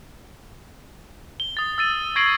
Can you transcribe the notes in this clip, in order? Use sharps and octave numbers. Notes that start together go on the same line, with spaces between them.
G7
D#6 A6
E6 A6 D#7
C#6 G#6 A#6 C7 D7 F#7